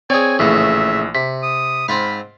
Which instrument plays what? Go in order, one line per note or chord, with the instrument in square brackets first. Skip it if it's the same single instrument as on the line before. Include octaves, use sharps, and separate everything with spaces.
[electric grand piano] C4 C#5 [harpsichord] G#4 D5 [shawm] G#5
[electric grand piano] A#1 E3 [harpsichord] A2 C#3 [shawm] E5
[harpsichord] C3 [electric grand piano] B6
[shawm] D#6
[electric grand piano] G#2 [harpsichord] C4 F4 F5 [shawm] B5